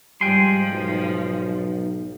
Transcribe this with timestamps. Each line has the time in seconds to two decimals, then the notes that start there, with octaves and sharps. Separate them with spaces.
0.21 G#2 F3 G3 G5 G#5 C6
0.69 B1